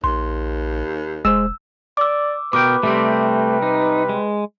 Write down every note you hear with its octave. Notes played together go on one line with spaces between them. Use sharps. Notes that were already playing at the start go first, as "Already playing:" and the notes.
A#1 D#2 C6
E1 G#3 C5 E6 E7
D5 D6 E6
B2 A#4 B4 G5 D6
C3 G3 A3 C4
D#4
G#3